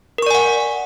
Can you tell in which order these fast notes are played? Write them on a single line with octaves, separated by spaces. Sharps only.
A#4 C#6 D5 G#5 F#5